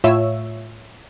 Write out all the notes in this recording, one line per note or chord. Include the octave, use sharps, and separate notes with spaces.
A2 F4 C#5 E5 E6